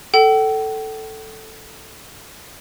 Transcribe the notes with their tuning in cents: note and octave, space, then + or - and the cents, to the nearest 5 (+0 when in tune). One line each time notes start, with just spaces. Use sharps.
A4 +0 G5 -45